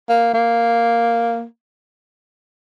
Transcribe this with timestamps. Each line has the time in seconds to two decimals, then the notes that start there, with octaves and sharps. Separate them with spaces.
0.09 A#3
0.34 A#3